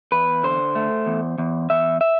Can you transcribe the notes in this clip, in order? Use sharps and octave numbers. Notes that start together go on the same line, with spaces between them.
E2 B4
D3 C5
A3
E2
E2
E2 E5
E5